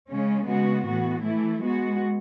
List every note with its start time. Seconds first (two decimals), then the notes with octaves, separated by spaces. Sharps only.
0.09 C#3 G#3 C#4
0.47 C#3 G#3 B3 F#4
0.86 A2 E3 B3 F#4
1.24 E3 A3 E4
1.62 G#3 B3 F#4